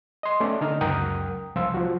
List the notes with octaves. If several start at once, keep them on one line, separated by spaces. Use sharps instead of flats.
D#5 C6
A3 C#4 D5
D3 D#4 F6
C#2 F#2 A#4 F#5 G5 D#6
C2 F3 F4 E6
F3 F#4